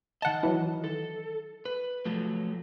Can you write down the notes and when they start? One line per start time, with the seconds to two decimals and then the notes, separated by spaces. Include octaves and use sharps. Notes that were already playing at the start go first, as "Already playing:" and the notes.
0.22 D#3 D#5 F#5 A5
0.43 E3 F#3
0.84 A4
1.65 B4
2.05 F3 F#3 A3